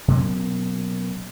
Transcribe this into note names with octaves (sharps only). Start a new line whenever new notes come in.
B2 F#3 A#3 C#4